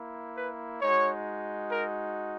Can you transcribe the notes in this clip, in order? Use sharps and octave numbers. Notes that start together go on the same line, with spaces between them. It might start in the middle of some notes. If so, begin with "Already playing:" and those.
Already playing: A#3 E4
B4
G#3 D#4 F#4 C#5
A#4